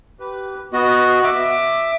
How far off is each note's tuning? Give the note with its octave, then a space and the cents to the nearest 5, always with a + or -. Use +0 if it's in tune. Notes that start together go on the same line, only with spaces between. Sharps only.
G4 -25 B4 +0
B3 +0 F#4 +0 D#5 +0
E5 +0 D6 +15